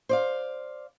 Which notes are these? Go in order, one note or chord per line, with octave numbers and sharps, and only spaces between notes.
C5 D5 F5